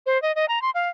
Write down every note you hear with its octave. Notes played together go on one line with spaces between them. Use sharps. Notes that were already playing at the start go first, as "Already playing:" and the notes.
C5
D#5
D#5
A#5
C6
F5